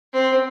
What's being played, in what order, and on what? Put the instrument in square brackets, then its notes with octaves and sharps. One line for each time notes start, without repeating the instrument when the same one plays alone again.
[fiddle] C4